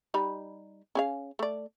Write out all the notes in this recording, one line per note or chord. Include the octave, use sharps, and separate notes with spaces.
G3 D#4 B5
C#4 G#4 F5
A3 D5